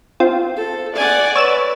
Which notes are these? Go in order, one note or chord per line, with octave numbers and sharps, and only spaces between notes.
C4 F4
A4
D5 F#5 G#5
B4 C#5 E6 E7